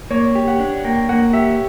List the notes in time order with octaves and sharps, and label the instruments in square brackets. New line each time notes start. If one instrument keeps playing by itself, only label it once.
[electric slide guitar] A#3 [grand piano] C#5
[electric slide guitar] G4
[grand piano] F#5
[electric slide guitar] D4
[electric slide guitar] A#3 [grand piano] G5
[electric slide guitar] A#3 [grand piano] F#5
[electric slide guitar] G4 [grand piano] E5